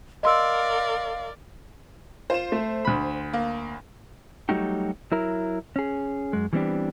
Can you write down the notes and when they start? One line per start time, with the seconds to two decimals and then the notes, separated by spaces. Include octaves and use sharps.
0.23 A#4 D5 D#5 F5 C6 E6
2.30 F4 C5 E7
2.52 A3
2.85 D2 B5
3.33 A#3
4.49 F#3 G3 A3 D#4 F#4 G4
5.12 F#3 E4 A#4
5.76 C#4 G#4
6.33 F#2 G#3
6.53 E3 G3 B3 C4 D4 G4